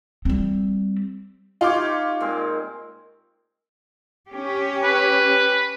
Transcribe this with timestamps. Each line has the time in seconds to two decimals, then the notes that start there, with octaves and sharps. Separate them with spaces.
0.25 G3 C4
1.61 D#4 F4 G4 C#5 C6 D6
2.20 A#2 G#3 C4
4.29 C#4 G4
4.84 B4